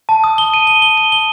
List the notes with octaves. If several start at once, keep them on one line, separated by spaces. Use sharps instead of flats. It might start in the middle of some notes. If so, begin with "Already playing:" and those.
A5
D#6
G7
D#7
G7
G7
G7
G7